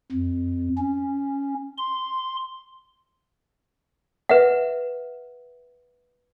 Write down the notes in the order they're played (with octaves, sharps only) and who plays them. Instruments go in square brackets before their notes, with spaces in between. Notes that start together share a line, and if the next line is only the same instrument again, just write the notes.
[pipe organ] F2
C#4
C6
[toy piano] B4 E5 F#5